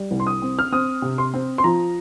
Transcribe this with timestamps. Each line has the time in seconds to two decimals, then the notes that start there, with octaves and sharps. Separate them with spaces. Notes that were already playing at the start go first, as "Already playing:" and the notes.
Already playing: G3
0.11 C2
0.20 C6
0.27 D#6
0.42 C4
0.59 F6
0.72 C4 D#6
1.02 C3
1.18 C6
1.34 C4
1.58 C6
1.64 F3 A#5